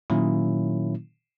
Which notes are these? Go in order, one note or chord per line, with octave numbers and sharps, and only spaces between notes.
A#2 D#3 F#3 A#3 C#4 E4